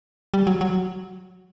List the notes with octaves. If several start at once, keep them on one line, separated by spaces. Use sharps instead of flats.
G3
F#3
F#3